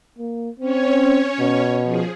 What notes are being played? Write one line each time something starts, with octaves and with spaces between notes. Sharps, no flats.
A#3
C4 C#4 C#5
B2
F3 G#4